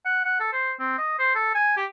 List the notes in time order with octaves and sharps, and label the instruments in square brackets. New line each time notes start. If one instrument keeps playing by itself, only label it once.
[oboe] F#5
F#5
A4
C5
C4
D#5
C5
A4
G#5
G4